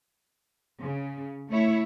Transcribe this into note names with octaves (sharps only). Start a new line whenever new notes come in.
C#3
A3 E4 C#5 E5